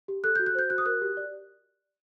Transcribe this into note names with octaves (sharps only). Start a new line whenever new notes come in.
G4
A4 F#6
F#4 G6
F#6
C5 G6
F#4 F#6
D#6
A#4 F#6
G4
D5